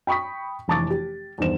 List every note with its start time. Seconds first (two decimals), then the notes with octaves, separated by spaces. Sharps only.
0.07 G5 B5 C#6 D#6 B6
0.68 F1 E3 A5 C#6 D6 A6
0.90 G4
1.38 E2 G2 D#3 C5 E7